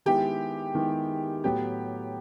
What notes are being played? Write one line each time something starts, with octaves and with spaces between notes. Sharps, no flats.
D#3 G#3 B3 E4 G4
D#3 G#3 B3 E4
A2 F#3 B3 G4